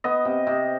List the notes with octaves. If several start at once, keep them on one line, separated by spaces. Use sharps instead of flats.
B3 D#5
C3
C3